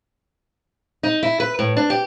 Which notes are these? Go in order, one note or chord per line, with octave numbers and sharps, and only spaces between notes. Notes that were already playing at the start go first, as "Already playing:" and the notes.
D#4
E4
B4
A2
D4
G4